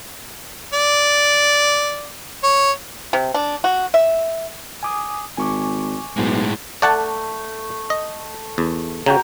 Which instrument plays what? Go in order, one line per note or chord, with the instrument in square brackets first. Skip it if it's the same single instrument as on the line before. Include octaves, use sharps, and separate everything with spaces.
[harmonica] D5
C#5
[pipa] C3
D4
F#4
E5
[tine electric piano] G#5 D6 D#6
[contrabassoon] G#1 [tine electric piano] G#5 C#6 D6
[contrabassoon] B1 [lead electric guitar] A2 G#3
[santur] A3 [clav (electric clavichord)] D5 F#5 A5
[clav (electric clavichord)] D#5
E2
[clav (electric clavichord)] C#3 [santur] F#4 G5 A#5